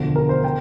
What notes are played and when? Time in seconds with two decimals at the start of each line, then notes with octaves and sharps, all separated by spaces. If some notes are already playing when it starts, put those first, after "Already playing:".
Already playing: E1 D2 D3 F3
0.16 A#4
0.29 C5
0.44 G5